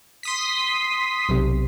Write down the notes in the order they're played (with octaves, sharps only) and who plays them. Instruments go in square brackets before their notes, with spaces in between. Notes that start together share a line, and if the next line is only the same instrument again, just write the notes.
[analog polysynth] C6 D#6 B6
[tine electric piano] B1 C3